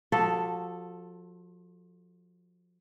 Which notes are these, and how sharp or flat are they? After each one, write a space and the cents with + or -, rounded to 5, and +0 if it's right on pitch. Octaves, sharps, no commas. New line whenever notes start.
F3 +30 F#4 +45 A4 +0